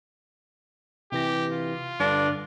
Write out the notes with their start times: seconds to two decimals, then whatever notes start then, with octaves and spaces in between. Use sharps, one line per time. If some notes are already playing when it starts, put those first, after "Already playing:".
1.12 C3 E3 G4 A#6
1.53 F4
2.00 G2 D3 D4 A#6